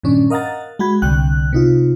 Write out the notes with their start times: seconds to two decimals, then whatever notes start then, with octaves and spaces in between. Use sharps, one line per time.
0.03 G2 A#2 D#3 C#4 D4
0.30 A#4 D#5 F5 F#5 A#5 A6
0.79 G#3 F#4 B5 G#6
1.02 C2 D3 G5 F#6
1.53 C3 D#4 F4